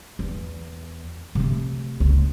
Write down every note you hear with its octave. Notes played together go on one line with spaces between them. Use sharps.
E2
C3 A3
C#2